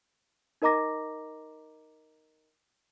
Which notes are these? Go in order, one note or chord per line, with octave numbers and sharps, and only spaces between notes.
D#4 A#4 D#5 A#5 D6 A#6